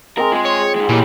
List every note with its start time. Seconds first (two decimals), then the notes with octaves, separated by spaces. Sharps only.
0.18 G#3 C4 A#4 D#5
0.32 G#3 F4
0.46 C#5
0.76 G#2 G#3
0.89 A#2 E3 G4 G#4